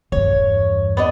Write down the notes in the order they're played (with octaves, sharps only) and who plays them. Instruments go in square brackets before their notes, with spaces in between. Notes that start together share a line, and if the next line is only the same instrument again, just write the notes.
[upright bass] E2 G2 [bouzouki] C#5
[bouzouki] B3 D4 D#5